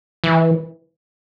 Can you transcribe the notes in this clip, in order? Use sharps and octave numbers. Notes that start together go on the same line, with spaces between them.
E3